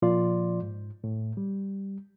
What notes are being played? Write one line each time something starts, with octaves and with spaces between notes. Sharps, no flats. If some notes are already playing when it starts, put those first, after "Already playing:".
A#2 F3 F4 D5 C6
G#2
A2
G3